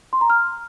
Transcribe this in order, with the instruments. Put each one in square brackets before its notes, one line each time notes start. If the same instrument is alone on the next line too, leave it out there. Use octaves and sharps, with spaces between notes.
[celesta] C6
A#5
F6